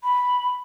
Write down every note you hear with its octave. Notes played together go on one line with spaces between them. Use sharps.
B5